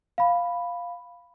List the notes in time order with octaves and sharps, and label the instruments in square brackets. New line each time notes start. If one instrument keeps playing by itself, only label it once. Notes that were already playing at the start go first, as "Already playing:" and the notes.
[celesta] F5 B5